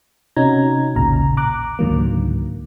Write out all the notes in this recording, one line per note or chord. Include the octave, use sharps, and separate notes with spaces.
C3 C#4 D#4 F#4 A#5 G#6
A1 D#2 A#2 C#3 A#5
A#5 D6 F#6
C#2 G#2 D3 D#3 F#3 A#3